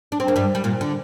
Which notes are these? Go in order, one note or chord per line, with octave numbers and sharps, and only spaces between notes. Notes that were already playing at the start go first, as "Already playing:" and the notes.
D4
C4
A#3
G2 G3
G3
A#2 A#3
D3